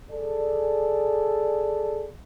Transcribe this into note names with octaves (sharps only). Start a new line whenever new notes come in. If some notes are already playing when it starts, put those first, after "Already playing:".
G#4 A4 D5